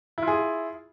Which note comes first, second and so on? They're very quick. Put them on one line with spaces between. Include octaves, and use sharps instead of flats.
E4 F4 G#4